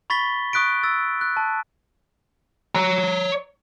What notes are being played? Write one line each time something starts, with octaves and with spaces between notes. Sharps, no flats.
B5 C#6 A6 B6 G7
C#6 D#6 F#6 B6 D7
E6 A6
F#6
A5
C#5 A#5